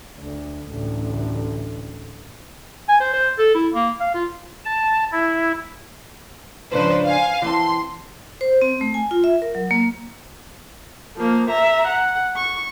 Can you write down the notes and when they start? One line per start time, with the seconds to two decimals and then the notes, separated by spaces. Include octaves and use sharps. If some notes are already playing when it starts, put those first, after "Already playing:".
0.20 D2
0.70 A1 D2
2.89 G#5
3.00 C5
3.13 C5
3.39 A4
3.54 E4
3.74 A#3
4.00 F5
4.14 F4
4.65 A5
5.12 E4
6.71 G#2 C#3 F3 D4 B4 C5
7.06 F5 G#5
7.42 E3 C4 A5 C6
8.41 C5
8.62 C4
8.81 A3
8.94 G#5
9.11 F4
9.24 E5
9.42 A#4
9.55 F#3
9.71 A#3
11.17 F3 A#3
11.50 E5 A#5
11.87 F#5
12.36 C#6